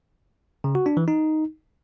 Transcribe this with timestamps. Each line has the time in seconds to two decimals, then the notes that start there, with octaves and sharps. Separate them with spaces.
0.64 C#3
0.75 F#4
0.86 D4
0.97 E3
1.08 D#4